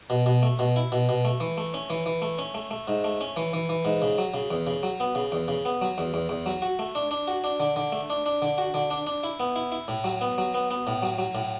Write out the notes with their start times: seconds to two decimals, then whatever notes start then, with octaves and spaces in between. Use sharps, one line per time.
0.10 B2
0.26 B2
0.43 A3
0.59 B2
0.76 E4
0.92 B2
1.09 B2
1.25 A3
1.40 E3
1.58 A3
1.74 C#4
1.90 E3
2.06 E3
2.22 A3
2.39 C#4
2.55 A3
2.71 A3
2.88 G#2
3.04 A3
3.21 C#4
3.37 E3
3.53 E3
3.69 E3
3.85 G#2
4.02 C#3
4.18 F#3
4.34 C#3
4.51 E2
4.67 C#3
4.83 F#3
5.00 B3
5.15 C#3
5.32 E2
5.48 C#3
5.65 B3
5.81 F#3
5.98 E2
6.14 E2
6.29 E2
6.46 F#3
6.62 F#4
6.79 A3
6.95 D4
7.11 D4
7.28 F#4
7.44 D4
7.60 D3
7.76 D3
7.92 A3
8.10 D4
8.26 D4
8.42 D3
8.58 F#4
8.74 D3
8.91 D4
9.07 D4
9.23 E4
9.40 B3
9.56 E4
9.72 E4
9.88 A2
10.04 F#3
10.21 B3
10.38 F#3
10.54 B3
10.71 B3
10.87 A2
11.02 F#3
11.18 F#3
11.35 A2